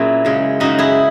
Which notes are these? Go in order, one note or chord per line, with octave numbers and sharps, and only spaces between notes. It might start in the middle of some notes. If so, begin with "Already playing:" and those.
Already playing: A#2 F#3 C#4 E4 G#4
F#2 C#3 G#3
F#2 C#3 G#3 D#4 F#4
E4 G#4